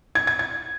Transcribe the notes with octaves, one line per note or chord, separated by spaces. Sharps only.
G#6
G#6
G#6